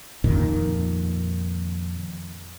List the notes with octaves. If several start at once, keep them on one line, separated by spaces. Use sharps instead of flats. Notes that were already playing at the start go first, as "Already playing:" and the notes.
F2 A#2 D#3